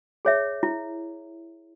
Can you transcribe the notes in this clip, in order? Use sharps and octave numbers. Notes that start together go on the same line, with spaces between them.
G#4 C#5 E5
E4